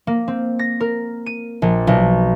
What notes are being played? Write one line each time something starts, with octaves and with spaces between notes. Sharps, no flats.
A#3
C4
A#6
A#4
D#7
A#1
B1